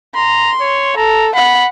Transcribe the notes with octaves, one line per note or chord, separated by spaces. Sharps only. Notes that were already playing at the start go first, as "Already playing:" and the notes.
A#5 C6
C#5
A4 A#5
F#5 B5